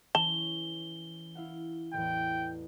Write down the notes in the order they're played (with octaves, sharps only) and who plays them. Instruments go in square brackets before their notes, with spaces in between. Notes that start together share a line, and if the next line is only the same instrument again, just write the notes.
[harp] E3 C#4 [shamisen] A5 [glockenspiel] G7
[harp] E4 F5 F#5
[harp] A1 E2 [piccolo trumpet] G5